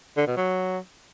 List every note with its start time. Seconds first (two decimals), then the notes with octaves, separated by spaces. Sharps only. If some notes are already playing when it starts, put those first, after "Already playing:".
0.17 D3
0.27 B2
0.37 F#3